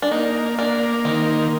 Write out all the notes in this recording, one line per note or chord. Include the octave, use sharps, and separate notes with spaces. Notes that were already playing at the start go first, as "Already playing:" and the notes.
D4
A#3 D#4
A#3 D4
D#3 C4